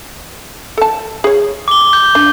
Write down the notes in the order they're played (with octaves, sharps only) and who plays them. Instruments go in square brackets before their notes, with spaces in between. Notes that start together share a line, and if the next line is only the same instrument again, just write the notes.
[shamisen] A4 A5
G#4 C#5
[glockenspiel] D6 G7
G6
[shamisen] D4